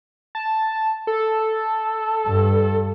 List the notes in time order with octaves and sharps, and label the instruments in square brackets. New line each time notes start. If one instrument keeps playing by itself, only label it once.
[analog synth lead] A5
A4
[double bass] G2